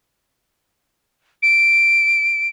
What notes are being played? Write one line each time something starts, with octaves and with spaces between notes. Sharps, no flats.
D7